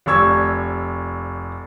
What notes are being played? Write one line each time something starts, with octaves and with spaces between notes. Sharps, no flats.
F1 C3 D5 C#6 E6 G#6